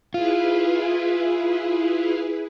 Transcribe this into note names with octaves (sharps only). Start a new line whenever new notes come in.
E4 F4 G#4 B4